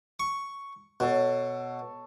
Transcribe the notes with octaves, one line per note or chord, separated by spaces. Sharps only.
C#6
B2 A4 C#5